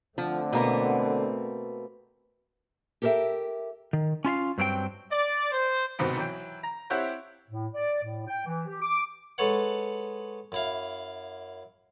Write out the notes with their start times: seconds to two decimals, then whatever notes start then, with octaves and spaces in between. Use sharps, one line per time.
0.18 D3 F3 A3 C4
0.53 B2 A#3 B3
3.02 G4 A4 A#4 C5 E5 G5
3.93 D#3
4.25 C#4 F4 E5 F5
4.58 G2 F#3 C4 G#4 G5
5.10 D5
5.52 C5
5.99 C2 G#2 B2 D#3 B3 C4
6.17 E3 F#3 G5
6.63 A#5
6.90 C4 E4 G4 C#5 F#5 G5
7.49 A2
7.73 D5
8.02 A2
8.27 G5
8.45 E3
8.67 G4
8.81 D6
9.38 G#3 A4 B4 C#5 F#5
10.52 F#2 E4 F5